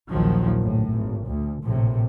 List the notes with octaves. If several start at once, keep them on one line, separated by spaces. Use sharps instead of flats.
A#1 D#2 A#2 D#3 F3 F#3
G1 A2
G#1
D2
A#1 A2 C3